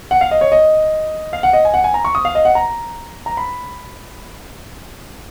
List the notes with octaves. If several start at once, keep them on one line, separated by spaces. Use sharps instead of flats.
F#5
F5
D#5
C#5
D#5
F5
F#5
D#5
G#5
F#5
G#5
A#5
C#6
D#6
F5
D#5
F#5
A#5
A#5
B5